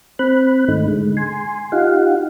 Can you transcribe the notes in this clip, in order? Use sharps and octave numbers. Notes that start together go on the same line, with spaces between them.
C4 B5 F#6
G#2 D#3 A3 D#4
D3 G#3
G#5 C6
D#4 F4 G4 F5 F#5